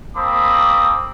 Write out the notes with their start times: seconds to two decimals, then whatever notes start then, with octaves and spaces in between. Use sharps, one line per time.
0.16 A#3 C4 A5 B5 D6 D#6